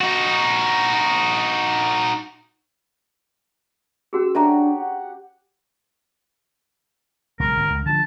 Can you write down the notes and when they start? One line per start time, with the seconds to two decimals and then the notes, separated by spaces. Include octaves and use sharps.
0.01 D#4 F#4
4.13 C#4 F#4 G#4 E6
4.35 D4 F#4 G4 A4 C#5 E5 A#5
4.78 F#5
7.40 B1 C#3 G#3 A#4
7.57 G1 G2
7.70 C#2
7.86 D3 F3 A5